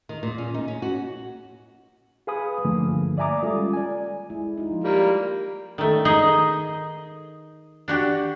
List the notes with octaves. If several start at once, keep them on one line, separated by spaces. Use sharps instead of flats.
D#3
A#2
C#4
D#4
C#4
F#4
G#4 B4 F5 G#5 B5 D#6
G2 D3 F3 A3 A#3
D5 E5 G#5 A#5 D6 D#6
G3 G#3 C#4 F4 A4
D5 G#5
G#3 E4
D#4 F4
F3
G3 A#3 G4
D#3 A3
D#4 G#4 D#5
D4 F#4 G4